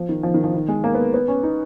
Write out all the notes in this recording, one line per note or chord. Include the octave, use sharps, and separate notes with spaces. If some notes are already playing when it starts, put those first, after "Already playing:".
Already playing: F3
D#3
F3
D#3
F3
D#3
G#3
A#3
B3
B3
C#4
D#4